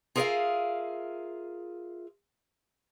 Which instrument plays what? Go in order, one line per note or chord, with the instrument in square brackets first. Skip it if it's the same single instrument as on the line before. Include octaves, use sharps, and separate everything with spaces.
[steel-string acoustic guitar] F4 G#4 A#4 C#5 E5 F5